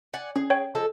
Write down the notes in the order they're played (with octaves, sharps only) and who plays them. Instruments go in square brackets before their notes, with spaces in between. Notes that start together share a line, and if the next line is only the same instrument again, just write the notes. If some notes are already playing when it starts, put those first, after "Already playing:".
[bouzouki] D5 F#5 G#5
[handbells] C#4 [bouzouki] G#4
[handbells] C#5 G5
[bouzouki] F3 G#3 A4